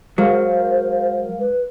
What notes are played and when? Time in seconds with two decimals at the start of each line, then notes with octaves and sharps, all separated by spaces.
0.18 F#3 G#3 A#4 C5 F5
1.40 B4